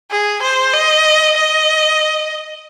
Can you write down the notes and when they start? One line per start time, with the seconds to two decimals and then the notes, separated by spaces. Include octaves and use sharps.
0.11 G#4
0.42 C5
0.74 D#5
1.36 D#5